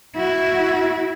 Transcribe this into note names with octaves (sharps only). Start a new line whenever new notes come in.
E4 F#4